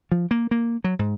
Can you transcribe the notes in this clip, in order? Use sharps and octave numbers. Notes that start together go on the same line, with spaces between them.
F3
A#3
A#3
F#3
G#2